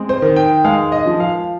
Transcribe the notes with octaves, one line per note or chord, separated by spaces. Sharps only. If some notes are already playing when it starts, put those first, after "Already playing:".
Already playing: G#3 C4
C5
D#3
G5
G#3 F5
D#5
F3
F5